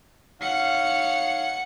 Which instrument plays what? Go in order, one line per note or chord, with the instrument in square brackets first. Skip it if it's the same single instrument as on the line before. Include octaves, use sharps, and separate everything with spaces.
[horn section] D#4 C#5 F5 [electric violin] F#5 C#7